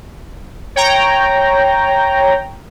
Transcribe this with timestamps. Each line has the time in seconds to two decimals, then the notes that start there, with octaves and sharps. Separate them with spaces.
0.76 C#5 G5 A#5